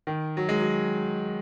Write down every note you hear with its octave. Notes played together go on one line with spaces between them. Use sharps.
D#3
F#3
G#3
F#3